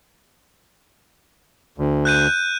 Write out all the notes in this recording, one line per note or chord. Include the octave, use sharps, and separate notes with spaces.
D2
F#6 G6 D#7